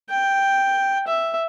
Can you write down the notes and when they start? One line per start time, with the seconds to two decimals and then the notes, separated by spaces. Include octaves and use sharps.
0.10 G5
1.08 E5